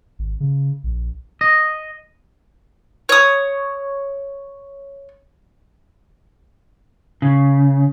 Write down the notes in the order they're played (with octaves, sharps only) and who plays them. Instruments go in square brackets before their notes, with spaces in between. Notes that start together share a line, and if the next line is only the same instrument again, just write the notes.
[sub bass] G#1
C#3
A#1
[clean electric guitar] D#5
[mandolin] C#5 D#6
[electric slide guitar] C#3